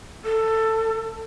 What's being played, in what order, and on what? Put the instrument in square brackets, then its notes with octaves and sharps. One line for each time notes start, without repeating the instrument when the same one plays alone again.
[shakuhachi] A4